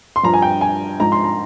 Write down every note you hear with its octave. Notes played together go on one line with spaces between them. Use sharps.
C6
G2 F3 A#5
G#5
G5
G#5
G#2 F3 A#5
C6
A#5